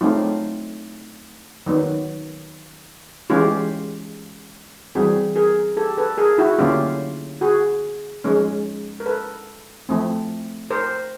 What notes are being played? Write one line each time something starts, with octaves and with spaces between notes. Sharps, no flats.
F#3 A3 C4 D#4 F4
D#3 F#3 B3
E3 G#3 C#4 F4 G4
E3 G3 C4 F#4 G#4
G#4 A#4
G4 A4
A4 B4
G#4 A#4
E4 F#4
D3 F#3 A#3 C#4 F4 G4
F#4 G#4
F3 G#3 C#4
A#4
A4 B4
F3 A3 C4
A#4 C5